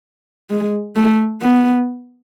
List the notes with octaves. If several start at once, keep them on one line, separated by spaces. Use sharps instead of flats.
G#3
A3
B3